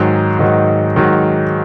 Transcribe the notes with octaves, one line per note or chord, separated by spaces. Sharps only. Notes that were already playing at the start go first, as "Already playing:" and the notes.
Already playing: G#2 D#3 F#3 G#4
G#2 D#3 F#3 D#4
G#2 D#3 F#3